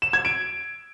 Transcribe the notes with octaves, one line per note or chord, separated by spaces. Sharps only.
E7
G#6
D7